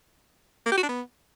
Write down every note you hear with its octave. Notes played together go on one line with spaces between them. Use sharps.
A#3
G4
F#4
D4
B3